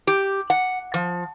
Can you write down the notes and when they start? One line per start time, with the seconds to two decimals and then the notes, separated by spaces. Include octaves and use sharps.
0.07 G4
0.50 F#5
0.94 F3